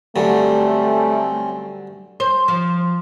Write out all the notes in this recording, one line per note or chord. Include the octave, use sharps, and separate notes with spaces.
G2 D3 F#3 G3 A3 C4 C#4
C5
F3